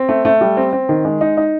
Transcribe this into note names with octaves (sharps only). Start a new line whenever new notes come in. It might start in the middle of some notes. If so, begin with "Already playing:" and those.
Already playing: C4
A3
A3
G3
C4
C4
D#3
G#3
D#4
D#4